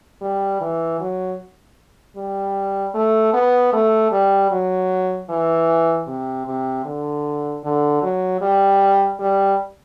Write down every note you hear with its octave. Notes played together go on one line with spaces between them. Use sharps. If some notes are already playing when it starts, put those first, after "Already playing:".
G3
E3
F#3
G3
A3
B3
A3
G3
F#3
E3
C3
C3
D3
D3
F#3
G3
G3